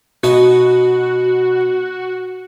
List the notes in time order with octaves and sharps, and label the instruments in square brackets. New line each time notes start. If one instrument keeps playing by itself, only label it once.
[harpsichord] B2 D#4 C#5 [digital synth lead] F#4